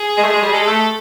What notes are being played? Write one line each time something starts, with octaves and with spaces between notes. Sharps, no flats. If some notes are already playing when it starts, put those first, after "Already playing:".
Already playing: G#4
G#3
A3
G#3
G3
G#3 A4
A3